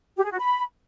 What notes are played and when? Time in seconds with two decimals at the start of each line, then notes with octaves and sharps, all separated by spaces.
0.16 G4
0.24 G#4
0.31 F#4
0.39 B5